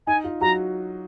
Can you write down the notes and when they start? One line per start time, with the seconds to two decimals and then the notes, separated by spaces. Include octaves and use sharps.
0.07 D#4 G#5
0.24 F4
0.41 F#3 F#4 A#5